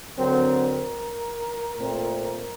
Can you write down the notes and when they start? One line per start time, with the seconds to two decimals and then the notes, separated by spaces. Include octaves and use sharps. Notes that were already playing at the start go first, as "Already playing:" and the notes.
0.17 D3 F#3 C4 A#4
1.76 A#2 A3 C4